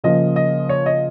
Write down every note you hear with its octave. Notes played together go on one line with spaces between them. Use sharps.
C#3 F3 A#3 D#5
D#5
C#5
D#5